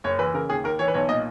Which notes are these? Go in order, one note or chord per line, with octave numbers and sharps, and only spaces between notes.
F#1 C#5
E3 B4
C#3 A#4
D#2 G#4
D#2 A#4
E3 C#5
B4
B1 C#5
A#2 D#5